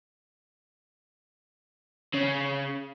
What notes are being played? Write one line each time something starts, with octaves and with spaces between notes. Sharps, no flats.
C#3